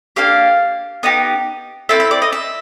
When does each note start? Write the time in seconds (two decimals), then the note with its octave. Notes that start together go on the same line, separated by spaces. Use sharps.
0.16 A#3 D4 G4 F5
1.03 B3 D#4 G4
1.89 C4 E4 A4 E5
2.00 E5
2.11 D5
2.22 D#5
2.32 E5